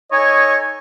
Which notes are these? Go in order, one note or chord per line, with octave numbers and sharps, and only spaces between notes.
D#4 A4 C#5 D#5 G#5 C#6